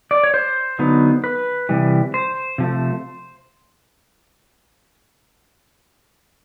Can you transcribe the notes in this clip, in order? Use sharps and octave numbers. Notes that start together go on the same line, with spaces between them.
D5
C#5
C5
D3 F#3 B3 D#4
B4
C3 E3 G3
C5
C3 F3 A3